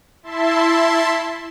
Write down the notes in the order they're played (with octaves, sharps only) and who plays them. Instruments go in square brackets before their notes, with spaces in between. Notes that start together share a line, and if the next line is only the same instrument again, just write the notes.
[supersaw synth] E4 E5 A5 C6